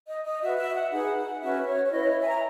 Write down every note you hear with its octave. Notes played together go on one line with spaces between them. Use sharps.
D#5
D#5
F#4 B4 E5
E5
F#5
D#4 G#4 B4 F#5
C#4 F#4 B4 E5
C#5
C#5
E4 B4 D#5
C#5
E5
G#5
A#5